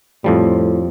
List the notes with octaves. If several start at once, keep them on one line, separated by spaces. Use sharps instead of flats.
F2 A2 F3 G3